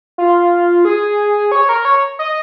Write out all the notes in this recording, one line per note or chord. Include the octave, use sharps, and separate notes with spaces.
F4
G#4
C#5
A#4
C#5
D#5